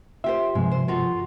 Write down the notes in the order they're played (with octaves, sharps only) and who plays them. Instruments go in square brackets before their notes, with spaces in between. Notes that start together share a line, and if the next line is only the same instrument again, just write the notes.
[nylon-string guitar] F4 G4 C5 [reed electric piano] E5
[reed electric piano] G2 C3 F3 [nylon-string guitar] G#3
[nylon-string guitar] C5
F4 F#4 A4